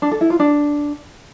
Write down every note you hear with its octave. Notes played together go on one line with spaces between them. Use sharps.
D4
A4
E4
F4
D4